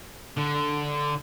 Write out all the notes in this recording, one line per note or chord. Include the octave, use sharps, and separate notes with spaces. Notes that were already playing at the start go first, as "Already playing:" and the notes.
D3